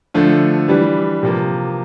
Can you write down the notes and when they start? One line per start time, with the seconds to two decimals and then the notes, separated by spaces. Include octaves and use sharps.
0.14 D3 F3 A3
0.68 E3 G3 D4
1.23 C3 F3 A#3